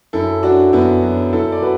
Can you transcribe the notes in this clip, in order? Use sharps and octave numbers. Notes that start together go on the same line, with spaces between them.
F#2 E4 A4
F#3 D4 F#4
F#2 B3 E4
F#3
F#2 E4 A4
D5
F#4 B4